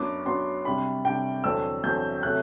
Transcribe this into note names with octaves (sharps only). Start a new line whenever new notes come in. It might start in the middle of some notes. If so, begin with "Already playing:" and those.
Already playing: F#2 F#3 B3 D4 D6
F#2 F#3 B3 D4 C6
C3 G3 D4 B5
C3 G3 D4 G5
E2 D3 F#3 C4 E6
E2 D3 F#3 C4 G6
C3 F#3 A3 F#6